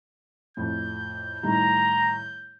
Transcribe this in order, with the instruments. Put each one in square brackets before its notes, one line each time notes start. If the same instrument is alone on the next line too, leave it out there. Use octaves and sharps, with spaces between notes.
[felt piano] F2 A2 [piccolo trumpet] G6
[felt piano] A2 D#3 G3 [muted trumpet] A#5